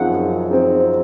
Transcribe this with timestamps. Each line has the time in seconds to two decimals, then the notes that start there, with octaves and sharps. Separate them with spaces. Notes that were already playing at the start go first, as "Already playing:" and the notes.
Already playing: F#2 F3 C4 D#4 G#4 F#5
0.10 F#2
0.50 F3 C4 D#4 G#4